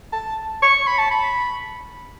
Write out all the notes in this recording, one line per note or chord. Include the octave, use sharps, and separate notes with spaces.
A5
C#6
B5
A5
B5